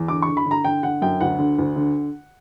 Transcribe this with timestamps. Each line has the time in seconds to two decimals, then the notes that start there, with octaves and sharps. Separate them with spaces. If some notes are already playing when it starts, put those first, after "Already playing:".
Already playing: E2
0.08 D3 D6
0.22 C#6
0.28 D3
0.37 B5
0.46 D3
0.51 A#5
0.65 D3 G5
0.83 D3 F#5
1.02 F#2 G5
1.21 D2 F#5
1.39 D3
1.59 D2
1.76 D3